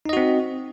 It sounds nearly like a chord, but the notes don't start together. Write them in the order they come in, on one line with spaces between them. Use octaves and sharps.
D#4 D#5 F#4 C4